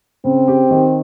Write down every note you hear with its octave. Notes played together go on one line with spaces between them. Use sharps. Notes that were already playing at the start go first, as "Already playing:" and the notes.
C#3 C4
G4
D#3